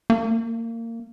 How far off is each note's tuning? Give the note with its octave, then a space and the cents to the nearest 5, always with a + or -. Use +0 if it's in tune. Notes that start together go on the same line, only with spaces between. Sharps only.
A#3 -25